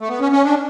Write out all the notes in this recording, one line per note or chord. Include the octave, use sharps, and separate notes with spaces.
A3
B3
C#4
C#4
D4